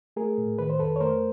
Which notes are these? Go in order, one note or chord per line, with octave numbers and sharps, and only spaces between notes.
A3 G#4 A#4
A2
D#3 B4
C5
F2 A4 B4
C#5
A3 A#4 C5